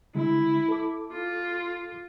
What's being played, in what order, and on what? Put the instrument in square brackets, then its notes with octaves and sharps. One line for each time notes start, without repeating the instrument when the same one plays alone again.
[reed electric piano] D3 G#3 [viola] E4
[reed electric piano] A4 D6
[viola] F4